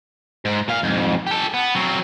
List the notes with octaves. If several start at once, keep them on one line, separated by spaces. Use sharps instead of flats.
G#2
A#2 F5
F2 G#2
G4 A4
B3
F#3 C4